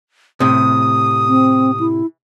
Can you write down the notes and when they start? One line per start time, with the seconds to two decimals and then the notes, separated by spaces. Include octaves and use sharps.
0.40 A2 C3 D#6
1.28 C4
1.80 E4